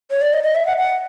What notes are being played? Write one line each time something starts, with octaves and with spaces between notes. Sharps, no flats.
C#5
D5
D#5
D#5
E5
F#5
F#5